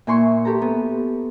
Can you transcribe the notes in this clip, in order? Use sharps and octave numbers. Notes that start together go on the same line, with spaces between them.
A#2 E4 G#5 C6 C#6
G4 A4 A#5
B3